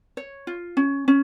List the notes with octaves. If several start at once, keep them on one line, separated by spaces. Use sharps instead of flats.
C#5
F4
C#4
C#4